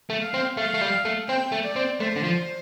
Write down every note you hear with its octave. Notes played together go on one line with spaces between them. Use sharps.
A3
F5
C4
A3 F5
A3
G3
A3
C4 G5
A3
D5
C4
A3 C5
D3
F3